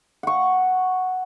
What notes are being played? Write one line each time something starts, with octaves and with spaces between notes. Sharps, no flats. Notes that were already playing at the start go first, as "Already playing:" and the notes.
F#5 C#6